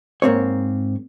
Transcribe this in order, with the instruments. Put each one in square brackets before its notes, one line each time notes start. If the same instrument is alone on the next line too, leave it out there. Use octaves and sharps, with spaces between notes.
[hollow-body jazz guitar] G#2 A#3 C4 C#5